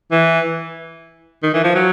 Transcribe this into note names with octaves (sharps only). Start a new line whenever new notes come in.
E3
D#3
E3
F3
F#3